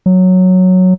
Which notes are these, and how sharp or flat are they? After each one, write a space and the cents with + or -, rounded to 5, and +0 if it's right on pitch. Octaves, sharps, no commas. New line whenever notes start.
F#3 -5